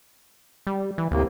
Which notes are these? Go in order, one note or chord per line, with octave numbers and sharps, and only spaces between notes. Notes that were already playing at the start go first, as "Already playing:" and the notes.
G3
E3
D2 A2 C3 A#3